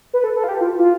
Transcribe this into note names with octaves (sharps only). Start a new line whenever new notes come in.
B4
A4
A4
F4
G4
F4
F4